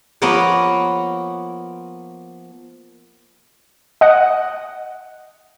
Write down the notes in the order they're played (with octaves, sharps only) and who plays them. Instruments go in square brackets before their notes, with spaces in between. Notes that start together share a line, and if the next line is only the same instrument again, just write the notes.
[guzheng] F3 A#3 B3 F4 A#4 C#5
[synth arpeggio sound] D#5 F#5